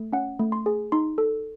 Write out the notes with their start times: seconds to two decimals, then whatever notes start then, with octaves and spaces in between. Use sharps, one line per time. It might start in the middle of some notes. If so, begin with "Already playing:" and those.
Already playing: A3
0.13 C#4 F#5
0.39 A3
0.52 C6
0.66 G#4
0.92 D#4 C6
1.18 A4